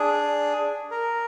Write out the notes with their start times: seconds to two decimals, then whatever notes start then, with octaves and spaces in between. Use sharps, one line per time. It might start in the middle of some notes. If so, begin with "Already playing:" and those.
Already playing: D4 G#4
0.91 A#4